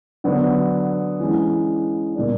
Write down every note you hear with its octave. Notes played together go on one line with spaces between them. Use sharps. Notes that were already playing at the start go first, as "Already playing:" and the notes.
D3 F#3 B3 D4
E3 G#3 C#4
A#2 G3 A#3 D4